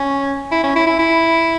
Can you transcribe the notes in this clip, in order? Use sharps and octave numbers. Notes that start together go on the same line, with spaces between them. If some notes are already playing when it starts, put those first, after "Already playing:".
Already playing: C#4
E4
C#4
E4
E4
E4